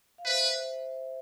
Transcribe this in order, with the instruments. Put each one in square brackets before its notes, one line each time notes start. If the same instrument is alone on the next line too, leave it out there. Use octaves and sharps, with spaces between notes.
[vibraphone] F5
[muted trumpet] B4 [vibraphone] C5 E5